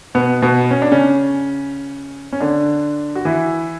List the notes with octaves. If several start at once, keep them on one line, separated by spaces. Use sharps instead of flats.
B2 B3
B2 B3
C#4
D4
C#3 C#4
C#4
D3 D4
F#4
E3 E4